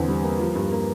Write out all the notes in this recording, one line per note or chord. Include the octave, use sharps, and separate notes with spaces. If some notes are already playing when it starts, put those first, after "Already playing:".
Already playing: E2 D3 C4
G3
A#3
F3
G2
A#3